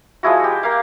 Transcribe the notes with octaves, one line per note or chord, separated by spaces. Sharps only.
F3 G#3 E4 F#4
G4
A#3 F5